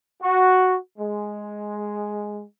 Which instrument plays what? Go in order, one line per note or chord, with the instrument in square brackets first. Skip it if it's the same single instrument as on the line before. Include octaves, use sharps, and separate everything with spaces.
[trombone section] F#4
G#3